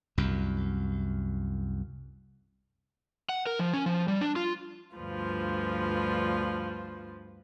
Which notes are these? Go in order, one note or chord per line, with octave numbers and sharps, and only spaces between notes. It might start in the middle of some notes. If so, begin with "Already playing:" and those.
C2 F#2
F#5
A#4
F3
C#4
F3
G3
D4
F4
D2 G2 F3 F4 B4